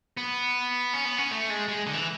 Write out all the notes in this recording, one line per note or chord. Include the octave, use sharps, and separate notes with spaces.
B3
C#4
B3
C#4
A3
G#3
G#3
D3
E3